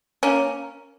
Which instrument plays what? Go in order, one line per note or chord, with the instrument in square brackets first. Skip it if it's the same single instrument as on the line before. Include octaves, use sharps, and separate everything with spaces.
[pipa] A#3 C#4